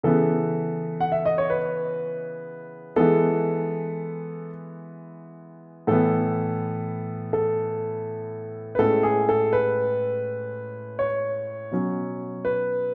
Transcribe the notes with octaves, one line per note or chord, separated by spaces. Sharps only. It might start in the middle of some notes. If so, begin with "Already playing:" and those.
C#3 E3 B3 A4
F#5
E5
D#5
C#5
B4
E3 G#3 B3 A4
A2 E3 B3 A4
A4
B4
A2 G#3 C#4 A4
G#4
A4
B4
C#5
B2 F#3 C#4
B4